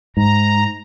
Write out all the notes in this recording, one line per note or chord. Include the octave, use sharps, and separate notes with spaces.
G#2 A#5